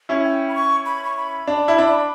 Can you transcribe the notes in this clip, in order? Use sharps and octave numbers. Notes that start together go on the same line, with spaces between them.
C#4 E4
G5
B5
C#6
B5
C#6
B5
D4
E4
D4